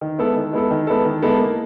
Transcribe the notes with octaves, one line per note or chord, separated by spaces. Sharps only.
D#3
G#3 B3 E4 A4
D#3
G#3 B3 E4 A4
D#3
G#3 B3 E4 A4
D#3
G#3 B3 E4 A4
A#3